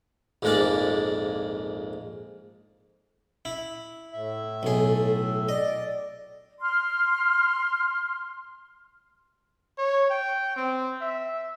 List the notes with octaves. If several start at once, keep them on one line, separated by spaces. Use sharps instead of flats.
A#1 F2 G#2 G#3 A#3 D5
E4
A2 E5
B1 G#4 A4
D5 D#5
C6 F6
C#5
G5
C4
E5